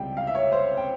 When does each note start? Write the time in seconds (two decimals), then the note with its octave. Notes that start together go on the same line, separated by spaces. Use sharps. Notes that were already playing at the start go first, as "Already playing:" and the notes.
Already playing: C#2 C3 G3 G5
0.17 F5
0.27 E5
0.35 C#5
0.52 C5
0.77 G5